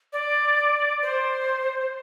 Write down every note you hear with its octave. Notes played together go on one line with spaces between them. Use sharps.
D5
C5